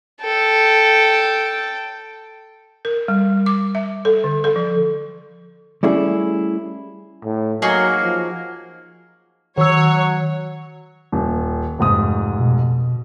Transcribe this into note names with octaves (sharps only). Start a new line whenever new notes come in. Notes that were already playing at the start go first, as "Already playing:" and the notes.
A4 G5
A#4
G3
D6
E5
A4
D3
A4
F3
G3 A3 C#4 E4 G#4
A2
F#3 A#3 D#4 F#4 G#4
F3
D#3 F#3 C#5 E6
D#1
F1 G#2 D#6
B2